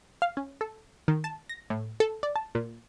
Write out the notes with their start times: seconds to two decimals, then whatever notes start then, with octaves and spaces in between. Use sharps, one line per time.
0.22 F5
0.37 C#4
0.61 A4
1.08 D#3
1.24 A5
1.49 A#6
1.70 A2
2.00 A4
2.23 D5
2.36 A5
2.55 A#2